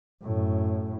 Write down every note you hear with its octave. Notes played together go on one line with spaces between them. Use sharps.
F#2 A2